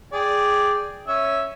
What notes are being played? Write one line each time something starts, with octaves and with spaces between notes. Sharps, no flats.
G#4 D5 G5
C#4 E5